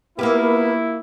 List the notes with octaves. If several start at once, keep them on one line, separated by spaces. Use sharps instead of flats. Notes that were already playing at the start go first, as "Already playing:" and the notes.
A#3 B3 E4 F4 G4 A#4